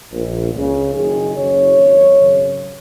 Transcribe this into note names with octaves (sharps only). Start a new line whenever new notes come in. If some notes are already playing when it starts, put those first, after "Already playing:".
A#1 A#2
C#2 C#3
F#1 F#2 D#3 G#4
F#1 F#2 C#3 C#5
G#1 F#2 D#3
G#1 F#2 C#3